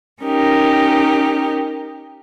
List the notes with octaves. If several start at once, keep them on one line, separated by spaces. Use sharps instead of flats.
C#4 D#4 G4 A#4